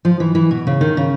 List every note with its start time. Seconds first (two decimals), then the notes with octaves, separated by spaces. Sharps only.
0.05 F3
0.20 E3
0.35 E3
0.51 B2
0.67 C#3
0.81 D#3
0.97 C#3